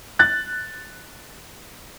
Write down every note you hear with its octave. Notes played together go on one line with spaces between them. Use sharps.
F#6 A6